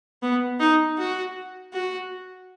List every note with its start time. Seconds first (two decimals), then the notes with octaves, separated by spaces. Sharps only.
0.22 B3
0.60 D#4
0.98 F#4
1.73 F#4